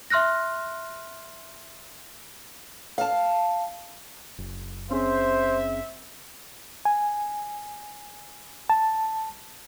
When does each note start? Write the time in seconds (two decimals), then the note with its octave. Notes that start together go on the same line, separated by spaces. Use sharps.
0.10 E5 C6 F6 F#6 A#6
2.98 F5 A5
4.38 F#1
4.91 C4 C#4 G#4 C5 E5
6.85 G#5
8.70 A5